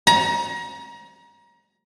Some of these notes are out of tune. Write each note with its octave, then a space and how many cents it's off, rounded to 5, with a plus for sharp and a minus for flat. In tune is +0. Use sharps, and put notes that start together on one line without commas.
A#5 +30